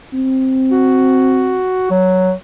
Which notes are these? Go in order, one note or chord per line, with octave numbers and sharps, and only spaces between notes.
C4
F#4
F#3